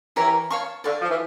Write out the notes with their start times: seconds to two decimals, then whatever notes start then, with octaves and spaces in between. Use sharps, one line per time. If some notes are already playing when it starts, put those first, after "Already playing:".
0.16 E3 E4 G4 A#4 C#5
0.50 C#5 F5 A5 C#6
0.84 D3 D5 F5 C#6
1.01 F3
1.10 E3